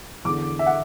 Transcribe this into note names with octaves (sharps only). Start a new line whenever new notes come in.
E2 D3 D6
E5
F#5